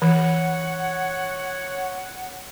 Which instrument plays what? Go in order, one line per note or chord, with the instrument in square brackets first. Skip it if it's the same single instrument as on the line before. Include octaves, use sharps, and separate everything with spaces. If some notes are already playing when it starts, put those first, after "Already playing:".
[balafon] E3 [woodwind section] C#5 F#5